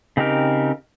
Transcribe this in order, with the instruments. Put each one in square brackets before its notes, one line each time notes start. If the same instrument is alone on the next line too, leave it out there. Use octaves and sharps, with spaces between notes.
[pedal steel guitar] C#3 C4 D#4 G4 A#4